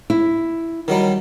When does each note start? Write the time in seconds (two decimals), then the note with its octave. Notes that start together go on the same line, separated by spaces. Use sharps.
0.10 E4
0.88 D#3 F#3 G3